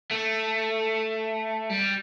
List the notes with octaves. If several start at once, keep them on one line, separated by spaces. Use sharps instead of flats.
A3
G3